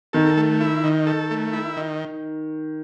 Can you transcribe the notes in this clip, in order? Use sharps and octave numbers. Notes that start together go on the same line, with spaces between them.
D#3 A4
A3
E4
D#3
A4
A3
E4
D#3